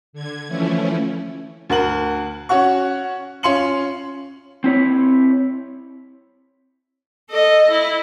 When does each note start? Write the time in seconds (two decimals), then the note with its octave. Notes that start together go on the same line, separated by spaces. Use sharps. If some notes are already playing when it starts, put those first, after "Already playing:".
0.13 D3 G#6
0.48 E3 F3 A3 C#4 E4
1.70 D2 A#4 F#5 F#7
2.49 C#4 F#4 F#5 C#6
3.43 C#4 F4 C6 C#7 F#7
4.64 C4 E4 C#5
7.30 A4 D#5
7.70 E4